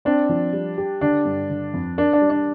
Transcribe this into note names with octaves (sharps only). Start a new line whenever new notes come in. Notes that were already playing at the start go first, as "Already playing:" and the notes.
C4 D4
F3
G3
G4
D3 D4
G2
D3
F2
D4 A#4
D4
G3
D4